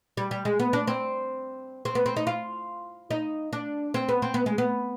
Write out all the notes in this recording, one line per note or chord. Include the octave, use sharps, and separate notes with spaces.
G3
G3
G#3
B3
D4
C4
C4
B3
C4
D#4
F4
D#4
D4
C4
B3
C4
B3
G#3
B3